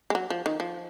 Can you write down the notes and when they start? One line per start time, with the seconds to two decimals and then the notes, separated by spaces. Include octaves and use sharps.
0.10 G#3
0.15 F#3
0.30 F3
0.46 D#3
0.60 F3